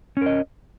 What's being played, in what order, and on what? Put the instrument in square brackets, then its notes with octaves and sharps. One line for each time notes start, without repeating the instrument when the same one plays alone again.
[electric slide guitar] C#4
A#4
D#5